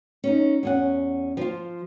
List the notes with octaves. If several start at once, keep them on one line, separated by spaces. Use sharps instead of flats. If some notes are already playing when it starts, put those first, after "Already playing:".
C#4 D#4
E2 C#4 F#5
F3 F4